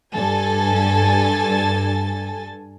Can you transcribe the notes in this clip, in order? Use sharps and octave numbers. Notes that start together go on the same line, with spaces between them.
G2 A4 G#5 A6